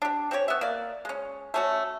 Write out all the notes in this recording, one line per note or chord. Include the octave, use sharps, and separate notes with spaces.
D4 G4
C4 C#4 G4 C#5
B3 E5
A#3 D5
G#3 C#4
A3 C#4 F#4